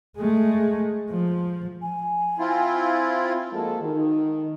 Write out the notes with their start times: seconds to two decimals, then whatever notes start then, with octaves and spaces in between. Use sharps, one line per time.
0.17 G#3 A3
1.10 F3
1.82 G#5
2.39 C4 E4 F4
3.52 F3 G#3 A#3 F#4 A4
3.81 D#3